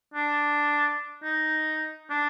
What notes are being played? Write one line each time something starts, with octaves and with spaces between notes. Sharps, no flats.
D4
D#4
D4